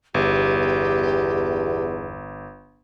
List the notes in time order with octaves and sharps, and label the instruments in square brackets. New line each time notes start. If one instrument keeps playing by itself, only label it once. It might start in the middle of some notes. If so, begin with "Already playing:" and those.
[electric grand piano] G1 [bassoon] E2 [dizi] G4